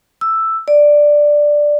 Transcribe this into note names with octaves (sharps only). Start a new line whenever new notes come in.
E6
D5